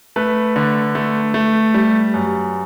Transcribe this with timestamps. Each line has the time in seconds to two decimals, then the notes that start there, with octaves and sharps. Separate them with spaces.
0.16 A3 B4
0.56 D3
0.95 A3
1.34 A3
1.74 G3
2.14 F#2